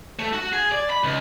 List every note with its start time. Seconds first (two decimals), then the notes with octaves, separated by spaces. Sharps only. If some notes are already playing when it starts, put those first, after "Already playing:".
0.19 A3
0.33 F#4
0.53 G#4
0.72 D5
0.90 B5
1.04 C#2